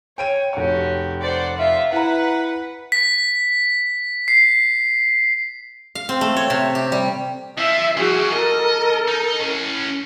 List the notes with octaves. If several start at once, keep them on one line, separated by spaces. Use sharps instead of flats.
C#5 G5 D7 D#7
F1 F#4 G4 C#5
C5 D5 F#5
F4 E5
E4 B4 F#5 A#5
B6
C7
F5
C4
A3
C#5
C3
G4
G3
F3 E5
F3 G3 F#4 G#4
A4 A#4 D#5
D#4
A2 C#4